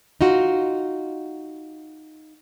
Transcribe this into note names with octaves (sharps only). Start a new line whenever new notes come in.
D#4 F4 F#4